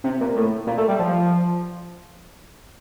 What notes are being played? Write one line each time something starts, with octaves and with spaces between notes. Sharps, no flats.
C3
A#2
A2
A#2
A3
G3
F3